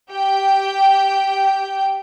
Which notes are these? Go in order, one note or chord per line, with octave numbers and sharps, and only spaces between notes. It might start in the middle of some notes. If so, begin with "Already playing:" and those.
G4 G5 G6